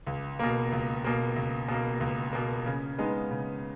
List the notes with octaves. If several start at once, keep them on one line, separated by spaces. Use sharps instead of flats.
C#2
B2 A#3
C#2
B2 A#3
C#2
B2 A#3
C#2
B2 A#3
C#3
G#3 B3 D#4
C#3